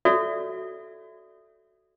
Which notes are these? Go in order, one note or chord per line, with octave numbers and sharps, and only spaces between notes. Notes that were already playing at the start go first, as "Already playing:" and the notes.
F#4 A4 C#5 D5 E5